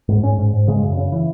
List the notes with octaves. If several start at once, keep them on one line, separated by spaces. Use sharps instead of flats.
G#2
G#2 C#4
G#2
G#2
C#3 G#3
F#2
C#3
E3